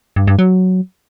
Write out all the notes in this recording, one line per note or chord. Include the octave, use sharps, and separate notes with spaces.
G2
G2
F#3